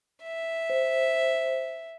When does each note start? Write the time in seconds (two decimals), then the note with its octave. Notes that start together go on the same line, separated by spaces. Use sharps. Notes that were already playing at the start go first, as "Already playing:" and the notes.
0.23 E5
0.70 C5